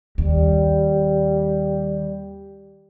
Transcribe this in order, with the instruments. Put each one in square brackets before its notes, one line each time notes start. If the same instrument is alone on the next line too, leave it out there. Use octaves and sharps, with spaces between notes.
[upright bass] D#2 [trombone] G3